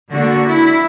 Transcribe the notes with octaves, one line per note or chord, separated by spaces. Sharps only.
D3 A#3 D4 F#4
E4